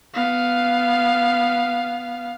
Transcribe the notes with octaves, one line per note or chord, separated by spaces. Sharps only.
B3 F5